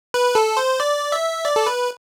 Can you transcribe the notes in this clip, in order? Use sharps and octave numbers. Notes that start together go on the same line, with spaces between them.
B4
A4
C5
D5
E5
D5
A4
B4